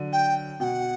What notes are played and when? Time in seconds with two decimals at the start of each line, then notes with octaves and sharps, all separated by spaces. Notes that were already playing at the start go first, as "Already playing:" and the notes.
Already playing: D3 F#3
0.13 G5
0.60 B2 G5
0.64 F#5